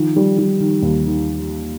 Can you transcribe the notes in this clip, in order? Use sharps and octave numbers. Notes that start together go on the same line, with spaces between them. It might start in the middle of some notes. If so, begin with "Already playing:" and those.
Already playing: D#3 F3
G3
G3
D#3
D#2
D#3